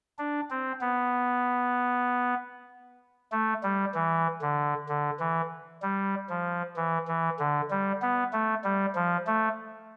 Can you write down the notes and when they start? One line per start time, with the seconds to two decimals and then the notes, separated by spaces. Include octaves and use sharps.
0.19 D4
0.50 C4
0.81 B3
3.32 A3
3.63 G3
3.95 E3
4.42 D3
4.89 D3
5.20 E3
5.82 G3
6.29 F3
6.76 E3
7.08 E3
7.39 D3
7.71 G3
8.02 B3
8.33 A3
8.64 G3
8.95 F3
9.27 A3